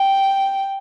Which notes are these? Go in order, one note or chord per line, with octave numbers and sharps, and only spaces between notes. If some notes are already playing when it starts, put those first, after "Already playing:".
Already playing: G5